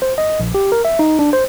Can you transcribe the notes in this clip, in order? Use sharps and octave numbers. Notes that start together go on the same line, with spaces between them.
C5
D#5
A#1
G4
A#4
E5
D#4
D4
C5